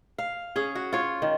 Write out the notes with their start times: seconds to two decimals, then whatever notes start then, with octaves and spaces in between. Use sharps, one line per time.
0.18 F5
0.56 C#4 G#4
0.75 F#4
0.93 F4 C#5
1.22 D#3